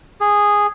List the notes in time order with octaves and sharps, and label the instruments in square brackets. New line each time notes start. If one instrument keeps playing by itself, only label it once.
[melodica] G#4